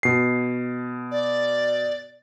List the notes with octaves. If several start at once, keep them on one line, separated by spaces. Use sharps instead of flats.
B2 C7
D5